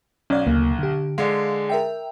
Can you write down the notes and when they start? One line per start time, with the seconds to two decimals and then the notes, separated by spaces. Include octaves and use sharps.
0.30 B1 C#4 D5 F5
0.47 D2 C#3 A#3
0.79 D3 G4
1.18 D3 G#3 F5
1.69 A#4 E5 G5